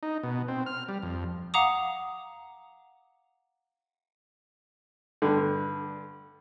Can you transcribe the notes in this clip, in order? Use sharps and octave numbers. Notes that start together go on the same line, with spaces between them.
D#4
B2
C4
F6
G3
F2
F5 F#5 A#5 D6 D#6
G2 D3